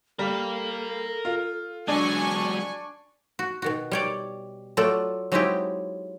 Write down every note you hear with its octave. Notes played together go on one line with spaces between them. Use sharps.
G3 A4 A#4 F5
F4
F#3 G#3 D4 G#5 C#6
F#4
B2 D#3 F#4
G3 C#5 D5
F#3 A3 F4 A4 D5
F#3 G#3 C4 D#4 E4 G4